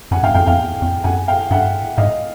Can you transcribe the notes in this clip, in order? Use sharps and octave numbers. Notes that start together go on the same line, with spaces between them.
F#2 F#5 G#5
G2 F5 G5
F#2 F5 G5
F2 F5 G5
E2
F2
F#2 F#5 G#5
F5 G5
G2 E5 F#5
G#2 D#5 F5